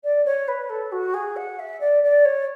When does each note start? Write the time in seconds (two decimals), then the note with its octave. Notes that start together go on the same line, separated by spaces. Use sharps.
0.04 D5
0.25 C#5
0.48 B4
0.69 A4
0.92 F#4
1.14 G#4
1.36 F#5
1.59 E5
1.80 D5
2.03 D5
2.25 C#5